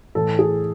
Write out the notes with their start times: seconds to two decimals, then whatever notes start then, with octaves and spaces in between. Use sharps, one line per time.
0.15 A2 E3 A4
0.39 G#4